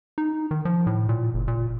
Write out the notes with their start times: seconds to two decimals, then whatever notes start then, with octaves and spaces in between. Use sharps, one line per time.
0.18 D#4
0.51 D#3
0.65 F3
0.87 A2
1.09 A#2
1.34 F#1
1.48 A#2